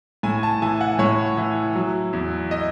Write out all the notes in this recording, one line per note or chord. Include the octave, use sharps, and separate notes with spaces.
A2 G#5
A5
E3 G#5
F#5
A2 C#5
E3
F#3
E2
D#5